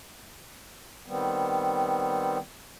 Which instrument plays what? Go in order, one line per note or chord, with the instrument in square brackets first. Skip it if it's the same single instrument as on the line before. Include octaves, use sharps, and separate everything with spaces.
[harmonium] D#3 G3 B3 C4